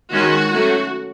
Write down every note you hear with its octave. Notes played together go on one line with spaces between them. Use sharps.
D#3 G#3 C#4 F#4
F#3 A3 C#4